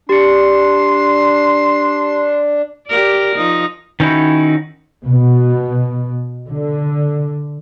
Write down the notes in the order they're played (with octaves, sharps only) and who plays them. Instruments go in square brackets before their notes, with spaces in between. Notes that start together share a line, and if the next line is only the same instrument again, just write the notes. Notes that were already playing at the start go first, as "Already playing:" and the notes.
[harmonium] D4 [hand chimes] G4 C#7 [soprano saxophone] C6
[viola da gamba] G4 A#4 D5
F3 D#4
[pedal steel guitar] D#3 C#4 D#4 E4 F#4
[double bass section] B2
D3